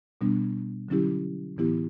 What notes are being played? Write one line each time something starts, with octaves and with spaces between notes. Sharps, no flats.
B2 G3 B3 D4
D3 F#3 C#4 E4 G4
A2 E3 B3 E4 G4